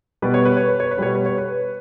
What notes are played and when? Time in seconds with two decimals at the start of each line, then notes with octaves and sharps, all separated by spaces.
0.22 B2 G3 B3 B4
0.34 C#5
0.45 B4
0.57 C#5
0.69 B4
0.80 C#5
0.91 B4
0.98 B2 G3 B3 C#5
1.15 B4
1.26 C#5
1.38 B4